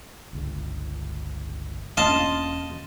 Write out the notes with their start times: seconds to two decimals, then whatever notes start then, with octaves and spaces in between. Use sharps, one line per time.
0.33 G1 C#2
1.97 E1 A#3 C#4 F4 D#5 A5